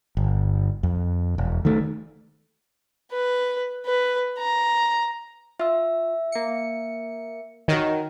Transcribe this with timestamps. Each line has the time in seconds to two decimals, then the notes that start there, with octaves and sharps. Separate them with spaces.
0.17 G1
0.83 F2
1.38 E1
1.65 D#3 A3
3.12 B4
3.86 B4
4.39 A#5
5.59 F4 E5 E6
6.32 A#3 C#7
7.68 D#3 F#4 A#4 C#5